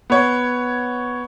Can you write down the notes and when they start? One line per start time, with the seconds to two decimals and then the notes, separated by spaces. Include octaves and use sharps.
0.10 B3 C#5